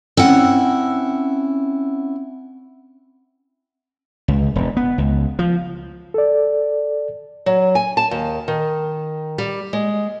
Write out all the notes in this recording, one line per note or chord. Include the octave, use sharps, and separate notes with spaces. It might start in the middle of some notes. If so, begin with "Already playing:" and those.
C4 C#4 E4 F#5
C#2
E1
B3
C#2
F3
A4 D5
F#3
G#5
A5
D#2
D#3
G3
G#3